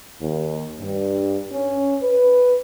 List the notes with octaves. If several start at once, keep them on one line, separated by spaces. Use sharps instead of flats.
D#2
G2
C#4
B4